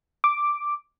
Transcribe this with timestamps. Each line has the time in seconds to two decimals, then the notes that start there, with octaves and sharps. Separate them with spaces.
0.24 D6